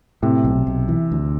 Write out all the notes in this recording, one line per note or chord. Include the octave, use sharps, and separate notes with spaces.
A2 C3
B1
B1
E3
D2